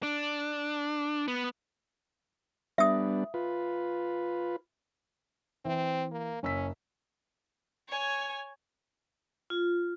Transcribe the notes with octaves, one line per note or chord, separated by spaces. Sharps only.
D4
B3
G3 B3 D4 E5 D#6
F4 B4
E3 C4
A#3
F#1 C#4 E6 B6
C#5 G#5
F4